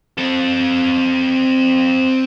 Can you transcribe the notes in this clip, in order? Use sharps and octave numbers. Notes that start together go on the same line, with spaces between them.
C4 A4